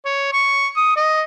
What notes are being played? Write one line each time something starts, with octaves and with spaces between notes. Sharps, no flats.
C#5
C#6
D#6
D#5